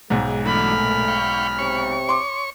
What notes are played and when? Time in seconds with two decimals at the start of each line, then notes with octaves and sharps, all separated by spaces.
0.10 B1 G#2 G#3
0.46 E3 F#3 A3 D4 B5 F6
0.79 A#2
1.08 F5 G5 C#6
1.59 C3 C#5 C#6
2.09 C6 D6